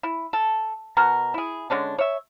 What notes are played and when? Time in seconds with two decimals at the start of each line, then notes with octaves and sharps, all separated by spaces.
0.03 E4
0.33 A4
0.97 B2 F#4 A#4
1.34 E4 G#4
1.70 D3 G#3 C#4 D4
1.98 C#5 E5